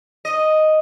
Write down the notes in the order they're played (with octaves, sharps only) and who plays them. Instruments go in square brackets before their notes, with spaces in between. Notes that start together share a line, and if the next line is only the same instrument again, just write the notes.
[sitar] D#5